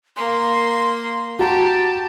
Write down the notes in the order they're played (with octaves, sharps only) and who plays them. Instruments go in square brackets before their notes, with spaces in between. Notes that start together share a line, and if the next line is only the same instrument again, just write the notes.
[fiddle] A#3 [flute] C6
[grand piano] F#4 A#5 [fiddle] G4 [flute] A5